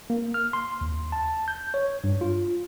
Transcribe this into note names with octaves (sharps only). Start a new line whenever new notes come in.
A#3
F6
C6
D#2
A5
G6
C#5
G2
F4